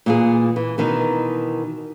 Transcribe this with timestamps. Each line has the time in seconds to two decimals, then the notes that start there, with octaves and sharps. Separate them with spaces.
0.06 A#2 E3 G#4
0.56 E3
0.78 B2 D#3 E3 D#4